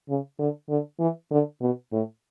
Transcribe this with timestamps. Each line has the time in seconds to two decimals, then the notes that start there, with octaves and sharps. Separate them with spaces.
0.09 C#3
0.39 D3
0.69 D3
0.99 E3
1.31 D3
1.61 B2
1.92 A2